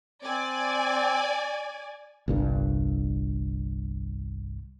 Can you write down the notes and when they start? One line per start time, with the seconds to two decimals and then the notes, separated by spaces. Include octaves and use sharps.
0.24 C4 D5 G#5
2.28 G1 C2 G2